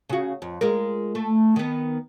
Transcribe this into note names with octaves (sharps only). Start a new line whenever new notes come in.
C#3 F#4
F2
G#3 F4 A#4
A3
D#3 B3